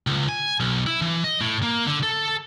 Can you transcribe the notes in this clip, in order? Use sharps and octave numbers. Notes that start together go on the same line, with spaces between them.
C#2
G#5
B1
E4
E3
D#5
A2
A#3
D3
A4